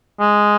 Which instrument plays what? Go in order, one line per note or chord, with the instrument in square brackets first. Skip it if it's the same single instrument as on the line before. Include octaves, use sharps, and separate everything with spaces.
[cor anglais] G#3